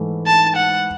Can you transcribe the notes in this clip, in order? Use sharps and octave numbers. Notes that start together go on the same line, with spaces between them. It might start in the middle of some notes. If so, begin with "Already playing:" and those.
Already playing: G#2 E3 A3
A5
F#5